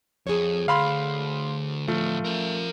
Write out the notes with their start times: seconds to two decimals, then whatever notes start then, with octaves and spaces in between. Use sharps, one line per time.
0.27 F2 G#4 C#5
0.68 D2 F5 B5 C6
1.88 D2 A2 F3 A3 F4
2.25 A#4 E5